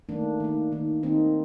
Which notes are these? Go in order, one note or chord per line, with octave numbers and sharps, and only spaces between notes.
D#3 A3 A#3 D4
D#3 A#3
D#3 A#3
D#3 A#3 C4 D#4